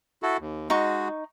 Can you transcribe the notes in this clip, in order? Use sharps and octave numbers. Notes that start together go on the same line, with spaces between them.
E4 F#4 A4
D#2
G#3 D#4 F#4 C#6